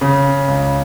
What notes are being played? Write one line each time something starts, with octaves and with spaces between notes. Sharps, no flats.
C#3
C#2